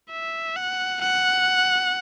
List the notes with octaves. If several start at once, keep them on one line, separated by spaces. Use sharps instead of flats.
E5
F#5
F#5